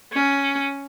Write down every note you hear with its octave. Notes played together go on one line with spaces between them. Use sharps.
C#4